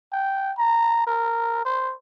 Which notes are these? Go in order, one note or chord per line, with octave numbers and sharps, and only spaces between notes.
G5
A#5
A#4
C5